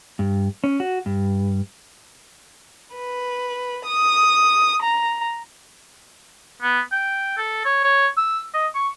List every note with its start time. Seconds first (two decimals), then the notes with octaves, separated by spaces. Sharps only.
0.19 G2
0.64 C#4
0.80 F#4
1.06 G2
2.96 B4
3.86 D#6
4.82 A#5
6.62 B3
6.92 G5
7.38 A4
7.65 C#5
7.84 C#5
8.17 E6
8.54 D#5
8.75 C#6